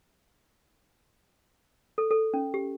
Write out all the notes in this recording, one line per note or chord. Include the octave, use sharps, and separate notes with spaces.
A4
A4
C#4
G4